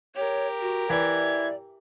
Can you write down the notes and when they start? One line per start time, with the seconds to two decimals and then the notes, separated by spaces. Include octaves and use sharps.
0.15 G4 A#4 C#5
0.61 F#4
0.90 E3 D5 G#6